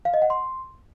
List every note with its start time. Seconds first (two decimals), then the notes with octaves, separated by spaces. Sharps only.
0.05 F5
0.14 D#5
0.22 F#5
0.30 C6